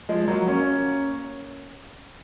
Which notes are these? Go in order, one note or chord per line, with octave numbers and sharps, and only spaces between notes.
F3 G#3
F#3 A#3
A#3 C#4